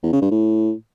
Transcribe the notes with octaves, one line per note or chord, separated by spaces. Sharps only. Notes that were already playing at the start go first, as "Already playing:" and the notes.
E2
C#3
G2
A2